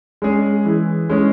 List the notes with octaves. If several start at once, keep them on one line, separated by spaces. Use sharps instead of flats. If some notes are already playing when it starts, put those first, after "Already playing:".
G#3 C#4 G#4
E3
G#3 C#4 G#4